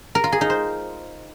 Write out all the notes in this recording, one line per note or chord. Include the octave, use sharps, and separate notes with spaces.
A#4
F4
G#4
D#4
C5